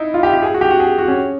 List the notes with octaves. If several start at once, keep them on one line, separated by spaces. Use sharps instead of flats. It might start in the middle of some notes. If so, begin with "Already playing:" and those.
Already playing: D#4 E4
F4
G4
G4
G#4
F#4
G4
F#4
G#4
F#4
C#4